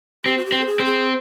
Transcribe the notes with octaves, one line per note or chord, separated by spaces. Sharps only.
C4 G4
F#4
G4
C4
A4
G#4
C4
G#4